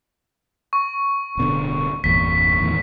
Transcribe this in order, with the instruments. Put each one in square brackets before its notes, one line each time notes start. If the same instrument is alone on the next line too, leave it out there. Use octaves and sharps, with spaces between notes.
[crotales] C#6
[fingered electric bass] D1 B2 D3
[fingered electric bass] G1 E2 A#2 [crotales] B6
[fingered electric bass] E2 A2 D#3